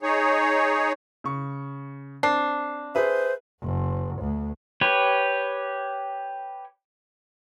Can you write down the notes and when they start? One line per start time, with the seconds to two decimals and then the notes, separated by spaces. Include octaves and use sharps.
0.02 D#4 G#4 C#5
1.24 C#3 C#6
2.23 C4 D4 C7
2.95 G#4 B4 C5 E5
3.61 F#1
4.20 D2
4.81 G4 B4 C#5